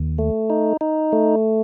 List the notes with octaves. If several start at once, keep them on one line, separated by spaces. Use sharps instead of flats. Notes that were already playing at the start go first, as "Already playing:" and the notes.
Already playing: D#2
A3
D#4
D#4
A3